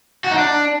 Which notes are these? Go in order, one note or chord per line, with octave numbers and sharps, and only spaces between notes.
F#4
D#4
D4